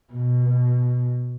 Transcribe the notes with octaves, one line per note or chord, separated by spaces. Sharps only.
B2